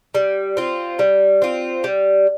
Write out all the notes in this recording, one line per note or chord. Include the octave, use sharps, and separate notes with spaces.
G3
C4 F4
G3
C4 F4
G3